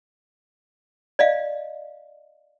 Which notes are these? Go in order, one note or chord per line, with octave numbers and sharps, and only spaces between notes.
D5 D#5 F5